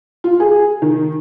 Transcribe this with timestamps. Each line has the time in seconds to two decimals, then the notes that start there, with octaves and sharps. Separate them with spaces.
0.24 F4
0.40 G#4
0.82 D#3